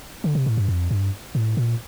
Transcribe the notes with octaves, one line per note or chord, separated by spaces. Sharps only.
D3
C3
A2
G2
F2
G2
A2
A#2